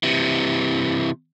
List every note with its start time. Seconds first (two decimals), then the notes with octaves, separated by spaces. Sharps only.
0.03 C3 E3